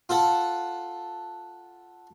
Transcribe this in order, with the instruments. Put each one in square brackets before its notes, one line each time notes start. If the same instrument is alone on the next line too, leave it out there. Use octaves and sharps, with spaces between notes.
[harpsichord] F4 A4 F#5 A5